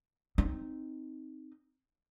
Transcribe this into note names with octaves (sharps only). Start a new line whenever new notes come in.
C4 D#4